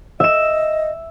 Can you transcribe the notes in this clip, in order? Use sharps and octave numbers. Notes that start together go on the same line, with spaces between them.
D#5 E5 E7